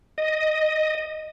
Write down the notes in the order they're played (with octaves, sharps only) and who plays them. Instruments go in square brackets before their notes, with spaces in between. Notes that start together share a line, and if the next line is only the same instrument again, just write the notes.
[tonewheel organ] D#5